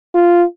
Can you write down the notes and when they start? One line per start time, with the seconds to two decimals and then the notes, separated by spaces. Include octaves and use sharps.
0.15 F4